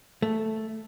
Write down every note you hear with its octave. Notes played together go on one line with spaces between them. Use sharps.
A3